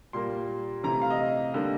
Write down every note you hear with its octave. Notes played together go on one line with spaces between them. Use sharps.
A#2 G3 A#3 C6
C3 E3 A3 A#5
F5
D#5
D3 G3 A#3